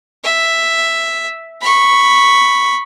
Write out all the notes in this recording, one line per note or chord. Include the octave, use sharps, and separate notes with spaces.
E5
B5 C#6